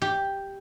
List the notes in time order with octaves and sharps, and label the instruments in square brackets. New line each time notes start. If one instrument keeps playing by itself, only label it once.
[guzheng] G4